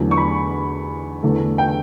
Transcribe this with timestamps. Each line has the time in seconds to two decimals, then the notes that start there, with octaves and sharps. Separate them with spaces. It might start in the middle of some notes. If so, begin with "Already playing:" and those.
Already playing: E2 D3 F#3 A3
0.11 C#6
0.17 B5
1.23 E2 D3 A3
1.58 G5